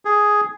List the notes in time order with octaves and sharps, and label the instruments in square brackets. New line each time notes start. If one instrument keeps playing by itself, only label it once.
[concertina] G#4